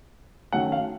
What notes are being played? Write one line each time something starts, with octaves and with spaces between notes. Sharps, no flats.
D#3 F#3 A3 C#4 F#5
F5